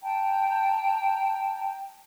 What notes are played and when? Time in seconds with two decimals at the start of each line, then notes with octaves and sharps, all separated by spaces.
0.02 G5 A5 A#5